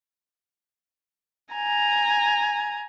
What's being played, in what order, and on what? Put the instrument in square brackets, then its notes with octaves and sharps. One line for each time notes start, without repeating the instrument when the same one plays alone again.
[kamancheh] G#5 A#5